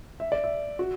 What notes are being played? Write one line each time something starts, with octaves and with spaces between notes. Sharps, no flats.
E5
D5
E5
F#4